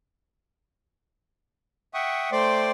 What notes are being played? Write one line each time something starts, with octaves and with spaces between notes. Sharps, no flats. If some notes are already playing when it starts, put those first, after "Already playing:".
E5 F#5 G5 C#6 D#6
A3 C5 D5 G5 C6 D6